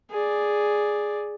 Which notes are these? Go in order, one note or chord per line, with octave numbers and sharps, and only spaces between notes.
G#4 D5